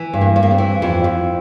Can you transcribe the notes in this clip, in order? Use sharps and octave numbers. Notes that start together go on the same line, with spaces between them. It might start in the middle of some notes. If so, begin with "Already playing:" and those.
Already playing: E3
G2
A#3
G2
A#3
C4
E3
F2 E4
F2